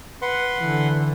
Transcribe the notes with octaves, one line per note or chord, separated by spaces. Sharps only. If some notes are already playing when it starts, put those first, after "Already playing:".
B4 F#5 C6
D3 E3